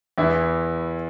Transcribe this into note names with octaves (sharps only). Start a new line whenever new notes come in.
E2 E3 E4